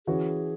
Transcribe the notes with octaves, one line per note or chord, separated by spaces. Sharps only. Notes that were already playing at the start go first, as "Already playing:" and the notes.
E3 C#4 F#4 G#4